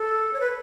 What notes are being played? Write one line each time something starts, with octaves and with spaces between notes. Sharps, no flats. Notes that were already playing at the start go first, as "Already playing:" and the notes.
Already playing: A4
C#5
B4